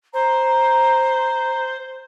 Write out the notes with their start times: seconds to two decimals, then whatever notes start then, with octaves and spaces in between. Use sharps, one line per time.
0.14 C5 A#5